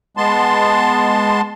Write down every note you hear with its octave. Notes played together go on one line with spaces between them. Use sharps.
G#3 B3 A5 C6